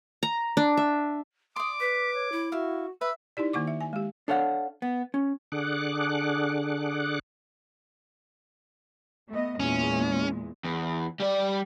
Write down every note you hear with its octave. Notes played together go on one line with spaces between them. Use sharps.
A#5
D4
E5
D5 C6 D6 D#6
B4 B6
C#5
E4
F#4 E5 F5
B4 E5 E6
D#4 E4 G4 D5
D#3 A#3 F#5 C#6 D6
E5
G#5
G#3 G4
D4 A4 C#5 F5 F#5
B3
C#4
D3 D4 G#4 F#5 D6 F#6
A3 B3 D#5
E2 A#2 G#3 C#4
E2
G3 D5